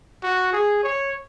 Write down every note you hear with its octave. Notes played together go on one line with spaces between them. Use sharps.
F#4
G#4
C#5